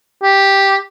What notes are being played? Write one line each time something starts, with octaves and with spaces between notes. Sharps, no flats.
G4